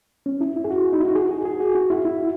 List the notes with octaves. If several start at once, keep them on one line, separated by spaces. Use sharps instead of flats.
C#4
E4
E4
G#4
F#4
D#4
E4
F#4
G#4
G#4
G#4
F#4
F#4
E4
E4